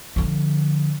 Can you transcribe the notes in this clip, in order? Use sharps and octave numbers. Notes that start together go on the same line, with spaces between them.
D3 F3